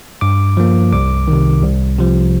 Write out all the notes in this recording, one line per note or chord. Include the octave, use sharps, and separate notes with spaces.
G2 D6
F3 A#3
C2 D6
C3 D#3
C2
C3 F3